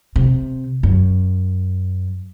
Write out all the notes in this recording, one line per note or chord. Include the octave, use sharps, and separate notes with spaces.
C3
F#2